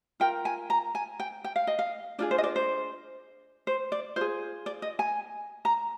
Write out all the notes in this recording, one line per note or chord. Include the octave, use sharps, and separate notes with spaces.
F4 A#4 G5
G#5
A#5
G#5
G5
G5
F5
D#5
F5
D4 F4 G#4 D5
C5
D#5
D5
C5
C5
D5
F4 G#4 C5
D5
D#5
G#5
A#5